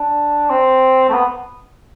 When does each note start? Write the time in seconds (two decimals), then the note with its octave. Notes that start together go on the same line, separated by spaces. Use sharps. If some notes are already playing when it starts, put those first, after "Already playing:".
Already playing: D4
0.50 C4
1.09 A3
1.13 B3